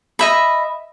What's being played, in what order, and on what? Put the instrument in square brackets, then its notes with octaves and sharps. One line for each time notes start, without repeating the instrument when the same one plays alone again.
[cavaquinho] D#5 E5 B5